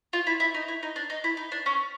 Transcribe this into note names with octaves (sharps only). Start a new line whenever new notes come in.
F4
E4
E4
D#4
E4
D#4
D4
D#4
E4
D#4
D4
C#4